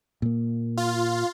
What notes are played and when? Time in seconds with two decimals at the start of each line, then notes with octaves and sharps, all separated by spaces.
0.22 A#2 A#3
0.78 F4